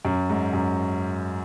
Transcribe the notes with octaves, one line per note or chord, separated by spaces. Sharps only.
F#2
G#2
F#2